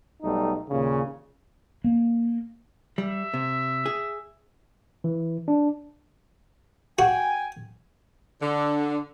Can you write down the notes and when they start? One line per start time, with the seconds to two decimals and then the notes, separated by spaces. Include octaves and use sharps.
0.22 B1 G3 A3 D#4
0.70 D#2 A#2 C#3
1.84 A#3
2.98 G3 E5
3.34 C3
3.86 G#4
5.04 E3
5.48 D4
6.99 F#4 G5 G#5
8.42 D3